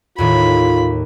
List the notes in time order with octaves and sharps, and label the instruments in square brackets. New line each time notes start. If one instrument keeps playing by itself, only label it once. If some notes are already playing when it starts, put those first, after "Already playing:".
[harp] D#2 A2 D#3 [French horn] F4 [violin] B5